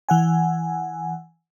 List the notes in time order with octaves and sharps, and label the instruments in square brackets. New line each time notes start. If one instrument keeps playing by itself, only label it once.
[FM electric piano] E3 F#5 G#5